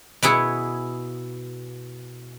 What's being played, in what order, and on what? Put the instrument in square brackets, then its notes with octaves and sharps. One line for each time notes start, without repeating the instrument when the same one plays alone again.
[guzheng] B2 B3 E4 G#4